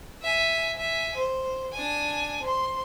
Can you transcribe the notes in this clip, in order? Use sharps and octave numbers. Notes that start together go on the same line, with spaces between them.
E5 G#5
E5 G#5
C5
D4 G#5
C5 C6